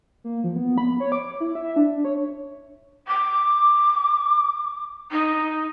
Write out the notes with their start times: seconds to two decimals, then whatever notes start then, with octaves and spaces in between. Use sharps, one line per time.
0.24 A#3
0.44 F3
0.56 B3
0.78 B5
1.00 C#5
1.12 D6
1.40 E4
1.55 E5
1.76 D4
2.05 C#5
3.07 D6
5.11 D#4